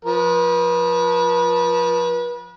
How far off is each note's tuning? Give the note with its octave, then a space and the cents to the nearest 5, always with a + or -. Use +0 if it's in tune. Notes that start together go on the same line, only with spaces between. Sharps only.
F3 +15 B4 -35